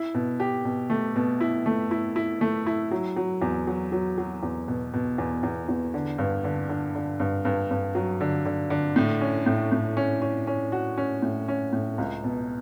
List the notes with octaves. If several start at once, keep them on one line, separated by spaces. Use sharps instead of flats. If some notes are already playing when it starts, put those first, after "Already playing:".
Already playing: E4
B2
G4
B2
A3
B2
E4
A3
E4
E4
A3
E4
F#3
F#3
E2
F#3
F#3
F#3
E2
B2
B2
E2
E2
E2
D3
G2
D3
D3
D3
G2
G2
G2
F#3
D3
D3
D3
A2
C#4
A2
A2
C#4
C#4
C#4
F#4
C#4
A2
C#4
A2
C#2
B2